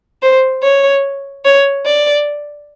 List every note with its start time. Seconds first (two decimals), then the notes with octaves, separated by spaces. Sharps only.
0.22 C5
0.63 C#5
1.45 C#5
1.86 D5